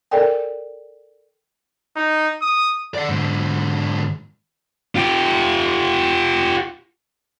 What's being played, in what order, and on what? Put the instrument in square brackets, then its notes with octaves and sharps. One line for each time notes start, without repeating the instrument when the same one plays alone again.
[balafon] A4 A#4 D5 G5 G#5
[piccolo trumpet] D#4
D#6
[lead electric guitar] D5 F#5
G#2 D3
F4 G4